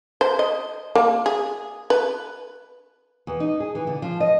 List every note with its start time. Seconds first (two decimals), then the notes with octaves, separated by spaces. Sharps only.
0.21 C5
0.39 D#5
0.95 A#3
1.26 G#4
1.90 B4
3.27 E2
3.40 D#4
3.60 G#4
3.75 E3
3.87 D3
4.02 F3
4.20 D#5